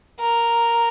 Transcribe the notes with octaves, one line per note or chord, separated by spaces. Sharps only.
A#4